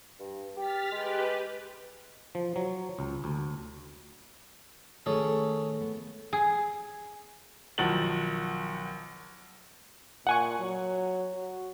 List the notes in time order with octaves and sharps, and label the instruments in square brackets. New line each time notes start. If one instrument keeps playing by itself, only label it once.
[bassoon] G2
[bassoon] G4 [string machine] F6 A6 B6
[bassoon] G#3 [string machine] G4 B4
[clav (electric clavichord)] F3
F#3
C#2
D2
[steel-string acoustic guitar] D#3 A3 [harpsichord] C#4 G#4 A4
[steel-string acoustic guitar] B3
[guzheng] G#4
[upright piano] B1 D#3 F3 F#5 A6 F#7
[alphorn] A#2 [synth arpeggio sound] F#5 G#5 C#6
[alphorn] F#3
F#4